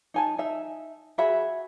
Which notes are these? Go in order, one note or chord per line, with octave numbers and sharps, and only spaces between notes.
D#4 G#5 A5
D#4 E5
F#4 G#4 E5 B5